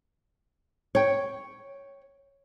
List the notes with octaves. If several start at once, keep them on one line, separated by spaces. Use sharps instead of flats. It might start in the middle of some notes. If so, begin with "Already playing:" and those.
C#5 G5